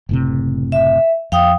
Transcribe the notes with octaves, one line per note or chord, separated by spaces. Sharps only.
F#1 A2 C3
E5
F2 F5 G5 D#6